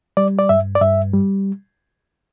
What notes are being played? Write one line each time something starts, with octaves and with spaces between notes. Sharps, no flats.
G3 D5
D5
G2 E5
D5
G2 E5
G3